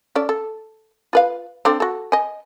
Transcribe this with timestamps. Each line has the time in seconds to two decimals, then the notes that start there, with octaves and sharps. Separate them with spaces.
0.15 C#4 A4 D5
0.29 A4
1.13 F4 B4 F5
1.65 C4 D4 A4
1.80 F#4 A4
2.12 D#5 G#5